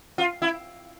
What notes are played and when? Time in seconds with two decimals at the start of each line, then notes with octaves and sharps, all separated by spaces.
0.18 F4
0.42 E4